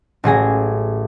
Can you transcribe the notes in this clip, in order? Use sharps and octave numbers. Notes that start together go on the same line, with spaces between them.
A1 F#3 G#4 A#6